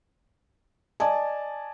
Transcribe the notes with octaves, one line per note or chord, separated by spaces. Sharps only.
D5 D#5 G#5 A5